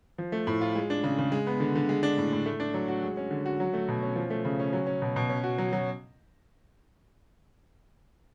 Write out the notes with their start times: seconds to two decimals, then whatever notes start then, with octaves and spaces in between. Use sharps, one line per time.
0.18 F3
0.32 A3
0.47 A2
0.61 F4
0.75 G#3
0.90 D4
1.04 C#3
1.19 C#3
1.32 G#3
1.47 B3
1.60 D3
1.75 D3
1.89 G#3
2.03 D4
2.18 A2
2.32 A2
2.46 A3
2.60 D4
2.74 F#3
2.88 F#4
3.03 G#3
3.17 C#4
3.31 D3
3.46 F#4
3.60 F#3
3.73 A3
3.88 B2
4.03 C#4
4.16 F3
4.30 A3
4.45 C#3
4.59 C#4
4.73 F#3
4.87 C#4
5.02 B2
5.16 B2
5.29 C#4
5.44 F#4
5.58 F#3
5.73 F#3